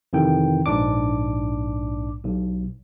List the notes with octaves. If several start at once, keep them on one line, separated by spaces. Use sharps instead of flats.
F2 C3 D#3 E3 G5
A#1 G#2 D4 D6
B1